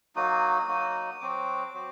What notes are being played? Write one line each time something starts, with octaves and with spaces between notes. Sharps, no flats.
F#3 A#3 D#4 F#4 D#6
F#3 A#3 D#4 F#4
F#3 C4 F#4 D6
F#3 C4 F#4